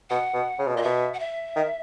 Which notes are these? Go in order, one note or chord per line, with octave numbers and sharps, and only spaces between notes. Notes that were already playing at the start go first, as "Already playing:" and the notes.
B2 F#5
B2
C#3
B2
A#2 D#5
B2 E5
F#5
E5
D#3